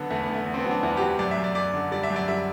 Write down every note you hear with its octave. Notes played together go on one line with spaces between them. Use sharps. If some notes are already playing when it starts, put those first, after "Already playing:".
Already playing: D3 F#3 B3
E2 A3
B3
D3
A3
E2
C4
B3
F#3
D4
E2 E4
G4
E2 F#4
F#2 D5
E5
F#2
D5
F#2 D5
D3
G3 D5
E5
F#2
D5
G3 E5